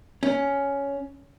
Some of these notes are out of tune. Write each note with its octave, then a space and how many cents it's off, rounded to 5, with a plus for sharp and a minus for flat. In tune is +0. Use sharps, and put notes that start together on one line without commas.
C#4 +10